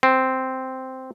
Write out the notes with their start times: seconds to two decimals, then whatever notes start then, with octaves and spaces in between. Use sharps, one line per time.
0.03 C4